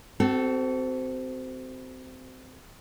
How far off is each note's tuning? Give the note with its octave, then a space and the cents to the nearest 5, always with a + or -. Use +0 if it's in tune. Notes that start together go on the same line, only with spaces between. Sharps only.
C4 -20 F#4 +35 A4 +0